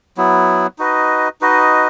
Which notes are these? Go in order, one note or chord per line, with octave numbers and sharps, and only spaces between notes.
F#3 B3 E4
D#4 F#4 B4 D#5
D#4 F#4 B4 D#5